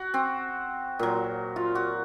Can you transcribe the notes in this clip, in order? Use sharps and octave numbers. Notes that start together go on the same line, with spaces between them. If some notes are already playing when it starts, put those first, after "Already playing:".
Already playing: F#4
C4
A#2 F#3
F4
F#4